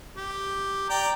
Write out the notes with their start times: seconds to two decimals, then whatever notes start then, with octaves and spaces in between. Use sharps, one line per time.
0.17 G4
0.90 D5 G5 A#5